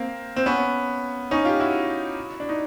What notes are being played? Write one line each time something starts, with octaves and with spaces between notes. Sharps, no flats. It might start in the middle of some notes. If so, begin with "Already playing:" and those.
Already playing: A#3 C4
C4
B3 C#4
C#4 D#4
F4 G4
E4 F#4
D4
D#4